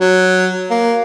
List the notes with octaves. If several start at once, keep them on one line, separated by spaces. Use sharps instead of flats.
F#3
A#3